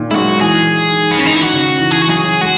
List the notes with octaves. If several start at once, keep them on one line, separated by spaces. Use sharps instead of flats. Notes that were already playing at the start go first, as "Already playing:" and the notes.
Already playing: A#2 D#3
G#3 E4
F#3 F#4
E3 G#4
D#3
B3
D#3
C#4
D#4
E4
D#3 F#4
C#3
D#3
E3
E3 G#4
F#4
F#3 G#4
F#3
G#3 F#4